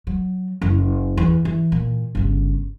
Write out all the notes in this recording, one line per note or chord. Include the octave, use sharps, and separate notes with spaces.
F#3
F#1 E4
E2
E3
A#2
G1 C#3